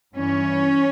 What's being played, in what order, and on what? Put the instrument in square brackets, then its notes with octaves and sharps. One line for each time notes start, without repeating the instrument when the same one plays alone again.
[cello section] G2 E3 C#4